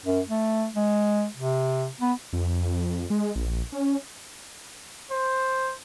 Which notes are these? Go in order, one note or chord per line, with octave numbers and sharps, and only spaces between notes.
F#2
A3
G#3
C3
B3
F2
G#3
A#1
C#4
C5